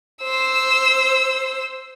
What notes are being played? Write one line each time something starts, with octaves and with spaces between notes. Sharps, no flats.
C5 E6